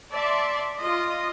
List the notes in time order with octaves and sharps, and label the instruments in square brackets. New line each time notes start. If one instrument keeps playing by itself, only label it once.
[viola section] D5 E5 A5 C6
F4 D#5